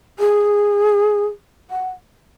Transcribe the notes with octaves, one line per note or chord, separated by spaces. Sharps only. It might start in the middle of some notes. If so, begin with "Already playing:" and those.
G#4
F#5